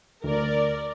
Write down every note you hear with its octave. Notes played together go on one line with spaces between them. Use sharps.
D2 A#4 D5